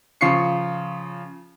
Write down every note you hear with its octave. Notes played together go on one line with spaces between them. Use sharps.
C#3 F3 F4 C#6 C7 C#7